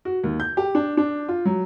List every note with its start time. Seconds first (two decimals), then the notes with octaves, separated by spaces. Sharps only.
0.05 F#4
0.24 D#2
0.40 G6
0.57 G4
0.75 D4
0.97 D4
1.28 F4
1.45 F#3